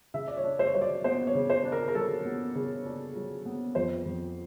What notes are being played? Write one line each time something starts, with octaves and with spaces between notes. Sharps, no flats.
C#3 E5
D5
C#5
D4
C5
C#5
F#3 C5
D5
B3 C5
C#5
C#3
C5
D4
A#4
A#4
F#3 A4
B3
C#3
D4
F#3
B3
F2 C5
F2